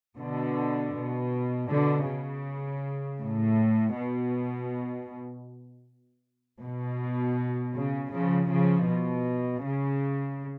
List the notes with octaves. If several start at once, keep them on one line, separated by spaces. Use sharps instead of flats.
B2 D3
B2
B2 D3
C#3
A2
B2
B2
C#3
C#3 F3
C#3 F3
B2
C#3